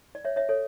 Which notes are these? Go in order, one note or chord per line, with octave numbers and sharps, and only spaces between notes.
D5
C#5 E5
C#5 E5
A4 C#5